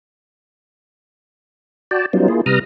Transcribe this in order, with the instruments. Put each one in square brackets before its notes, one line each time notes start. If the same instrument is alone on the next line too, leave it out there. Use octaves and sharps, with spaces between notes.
[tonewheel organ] F#4 D5 G5 A5
F#3 G3 B3 C#4 D#4 F4
A#3 E4 F4 G#4
C3 G3 B4 A#5 D#6 F6